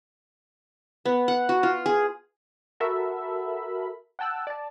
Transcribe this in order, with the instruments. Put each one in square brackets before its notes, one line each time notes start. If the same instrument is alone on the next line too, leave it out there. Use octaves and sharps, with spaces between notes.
[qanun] B3
F#5
F#4
F4
G#4
[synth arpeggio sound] F#4 A4 A#4 E5 B5
F#5 G5 A5 E6 F#6
D5 A5